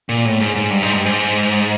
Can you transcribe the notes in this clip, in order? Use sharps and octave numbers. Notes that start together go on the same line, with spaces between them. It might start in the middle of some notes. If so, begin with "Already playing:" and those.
A#2
A2
G#2
G#2
G2
G#2
G2
G#2